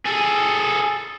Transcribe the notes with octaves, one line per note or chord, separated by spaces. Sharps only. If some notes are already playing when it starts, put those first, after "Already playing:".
G#4 A4